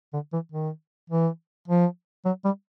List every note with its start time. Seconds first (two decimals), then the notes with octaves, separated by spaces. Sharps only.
0.13 D3
0.33 E3
0.52 D#3
1.10 E3
1.68 F3
2.25 F#3
2.45 G3